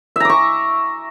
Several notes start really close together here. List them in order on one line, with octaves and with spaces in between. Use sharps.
E5 A#5 D6 C#6